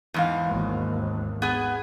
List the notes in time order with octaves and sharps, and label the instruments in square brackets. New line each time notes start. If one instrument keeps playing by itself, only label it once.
[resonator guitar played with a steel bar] E2 G#2 F5
[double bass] G#1 D#2
[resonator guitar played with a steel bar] B3 G#4